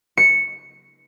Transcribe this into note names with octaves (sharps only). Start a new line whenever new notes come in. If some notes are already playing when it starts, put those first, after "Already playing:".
C#7